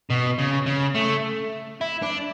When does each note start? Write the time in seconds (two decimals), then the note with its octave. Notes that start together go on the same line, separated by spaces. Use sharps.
0.10 B2
0.39 C#3
0.66 C#3
0.95 A3
1.81 E4
2.03 D4